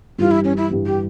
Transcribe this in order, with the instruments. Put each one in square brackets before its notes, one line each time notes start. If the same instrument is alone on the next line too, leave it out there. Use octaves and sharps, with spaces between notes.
[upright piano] G2 E3 G3 [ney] F4
[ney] E4
C#4
E4
[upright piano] G2 E3 G3
[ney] G4